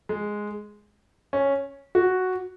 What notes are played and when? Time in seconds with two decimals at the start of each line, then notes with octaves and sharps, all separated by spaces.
0.09 G#3
1.33 C#4
1.95 F#4